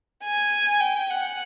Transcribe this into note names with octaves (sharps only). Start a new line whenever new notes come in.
G#5
G5
F#5